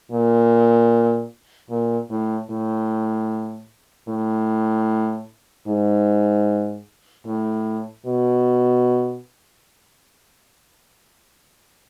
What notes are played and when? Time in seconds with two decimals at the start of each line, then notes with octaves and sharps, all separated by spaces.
0.11 A#2
1.70 A#2
2.10 A2
2.50 A2
4.08 A2
5.68 G#2
7.26 A2
8.06 B2